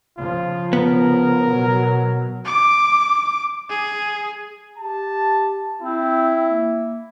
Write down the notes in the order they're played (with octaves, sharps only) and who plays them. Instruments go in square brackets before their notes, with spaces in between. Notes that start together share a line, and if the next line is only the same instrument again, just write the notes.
[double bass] C#3 F3 [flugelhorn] F4
[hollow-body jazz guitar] B3 [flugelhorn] A#4
[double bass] B2 F#3
[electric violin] D6
G#4
[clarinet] G4 [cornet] A5
[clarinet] C4 [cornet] E4
[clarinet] A#3